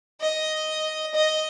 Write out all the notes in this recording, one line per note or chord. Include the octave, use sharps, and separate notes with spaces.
D#5
D#5